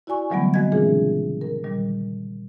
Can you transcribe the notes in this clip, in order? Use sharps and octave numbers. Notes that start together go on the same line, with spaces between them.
E4 F#4 D5 G#5 C#6
D3 E3 F#3 G3 A3 B3
G#3 C4 F#4 D#5 G#6
A#2 C#3 E3 D4 F4 G#4
A#4
A#2 D#3 G3